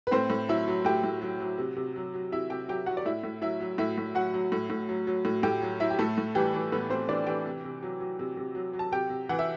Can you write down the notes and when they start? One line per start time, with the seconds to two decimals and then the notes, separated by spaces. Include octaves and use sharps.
0.07 B4
0.11 A2 C4 C5
0.30 A2
0.49 F#3 E4 E5
0.68 F#3
0.85 A2 G4 G5
1.04 A2
1.22 F#3
1.40 F#3
1.58 C3
1.76 C3
1.96 F#3
2.14 F#3
2.32 C3 E4 E5
2.50 C3 G4 G5
2.68 F#3 G4 G5
2.86 F#3 F#4 F#5
2.97 D5
3.05 A2 E4 E5
3.24 A2
3.41 F#3 E4 E5
3.61 F#3
3.78 A2 E4 E5
3.98 A2
4.15 F#3 F#4 F#5
4.34 F#3
4.52 A2
4.70 A2
4.89 F#3
5.07 F#3
5.25 A2
5.43 A2 G4 G5
5.62 F#3
5.80 F#3 E4 E5
5.90 G4
5.99 A2 A3 A4
6.18 A2
6.35 E3 G3 G4
6.54 E3
6.72 A2 B3 B4
6.90 A2 C4 C5
7.09 E3 D4 D5
7.27 E3 G4 G5
7.45 C3
7.64 C3
7.83 F#3
8.00 F#3
8.19 C3
8.37 C3
8.55 F#3
8.73 F#3
8.79 A5
8.92 C3 G4 G5
9.10 C3
9.29 E3 F#5
9.39 E5